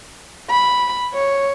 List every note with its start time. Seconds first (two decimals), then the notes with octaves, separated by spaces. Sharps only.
0.50 B5
1.14 C#5